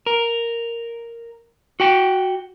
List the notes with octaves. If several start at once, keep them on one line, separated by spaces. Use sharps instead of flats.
A#4
F#4 G5